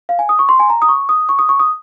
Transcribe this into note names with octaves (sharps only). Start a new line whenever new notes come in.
F5
G#5
D#6
C#6
C6
G#5
A#5
D#6
C#6
D#6
C#6
D#6
C#6
D#6